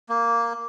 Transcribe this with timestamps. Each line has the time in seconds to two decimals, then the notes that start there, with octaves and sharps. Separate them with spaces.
0.09 A#3